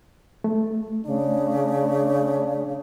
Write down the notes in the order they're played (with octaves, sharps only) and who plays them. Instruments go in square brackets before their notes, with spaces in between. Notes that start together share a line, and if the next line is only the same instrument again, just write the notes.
[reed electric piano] A3
[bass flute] C#3 [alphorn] D4